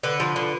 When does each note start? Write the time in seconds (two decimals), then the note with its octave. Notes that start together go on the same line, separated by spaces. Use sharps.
0.03 D3 B4
0.20 F3
0.36 D3